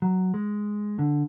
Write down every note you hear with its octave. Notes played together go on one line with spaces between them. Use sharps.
F#3
G#3
D3